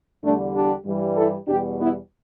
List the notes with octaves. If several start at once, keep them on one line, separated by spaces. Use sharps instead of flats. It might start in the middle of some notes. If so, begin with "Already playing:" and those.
E2 D3 G3 A3 D4
D4 G4
G2 E3 G3
E4 A4
E2 B2 G3 D4 G4
B3 E4